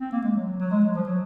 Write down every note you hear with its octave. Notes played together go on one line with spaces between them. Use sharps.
C4
A#3
G#3
F#3
F#3
F#3
G#3
F#3
F3
F#3